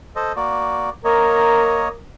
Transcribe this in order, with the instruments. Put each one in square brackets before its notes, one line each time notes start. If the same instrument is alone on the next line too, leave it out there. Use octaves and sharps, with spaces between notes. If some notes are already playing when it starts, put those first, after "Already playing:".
[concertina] A4 C5 D#5
A#3 F#4 D5
[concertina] A#3 C#5 D#5 [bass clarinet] A#4